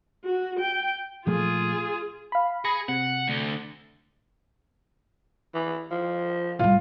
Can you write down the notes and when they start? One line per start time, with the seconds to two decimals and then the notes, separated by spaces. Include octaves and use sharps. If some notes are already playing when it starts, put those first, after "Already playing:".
0.25 F#4
0.60 G5
1.27 A#2 F3 A3 F4 G#4
2.32 F5 B5
2.65 G#4 B5 A#6 C#7
2.88 C3 F#5
3.28 D2 D3
5.54 E3
5.91 F3
6.59 A2 G3 F4